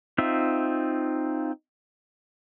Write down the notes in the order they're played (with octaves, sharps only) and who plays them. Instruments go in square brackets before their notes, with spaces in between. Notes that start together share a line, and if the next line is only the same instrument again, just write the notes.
[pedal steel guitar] C4 D#4 F4 E5